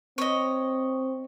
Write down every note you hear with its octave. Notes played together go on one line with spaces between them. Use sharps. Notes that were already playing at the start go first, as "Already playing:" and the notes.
C4 C#5 D#5